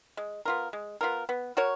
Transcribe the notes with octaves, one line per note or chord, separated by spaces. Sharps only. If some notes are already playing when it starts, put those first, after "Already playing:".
G#3
B3 F4 A#4
G#3
B3 F4 A#4
B3
F#4 A#4 C#5